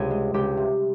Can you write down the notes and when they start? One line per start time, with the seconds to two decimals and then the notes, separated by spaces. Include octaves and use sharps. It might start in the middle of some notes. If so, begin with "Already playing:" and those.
Already playing: C#2 C3 G3 G#4
0.11 G#3
0.34 C#2 G4
0.57 C3